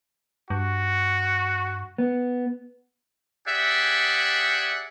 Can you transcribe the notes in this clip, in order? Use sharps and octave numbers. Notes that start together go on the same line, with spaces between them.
G2 F#4
B3
G4 G#4 D5 E5 F#5